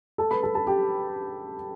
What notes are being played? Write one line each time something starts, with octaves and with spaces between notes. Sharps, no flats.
A4 A5
B4 B5
A4 A5
A4 A5
G4 G5